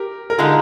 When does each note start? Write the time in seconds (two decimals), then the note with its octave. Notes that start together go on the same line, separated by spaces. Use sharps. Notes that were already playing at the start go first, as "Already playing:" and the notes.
Already playing: G4 A#4
0.30 A#4
0.38 D3 G#3 D#4 F4 G#4